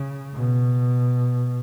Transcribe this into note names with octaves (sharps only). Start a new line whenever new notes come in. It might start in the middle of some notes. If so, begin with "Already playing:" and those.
Already playing: C#3
B2